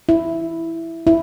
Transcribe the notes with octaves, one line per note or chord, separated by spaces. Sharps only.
E4
E4